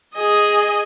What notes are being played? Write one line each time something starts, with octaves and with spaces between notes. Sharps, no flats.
G#4 D#5